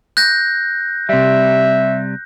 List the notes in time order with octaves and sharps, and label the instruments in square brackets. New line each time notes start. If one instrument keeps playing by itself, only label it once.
[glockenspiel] F#6 G6 A#6
[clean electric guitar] C3 G3 [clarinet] E5